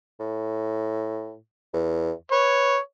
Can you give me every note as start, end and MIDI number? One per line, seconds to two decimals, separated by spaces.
0.20 1.37 45
1.73 2.12 40
2.32 2.77 71
2.32 2.78 73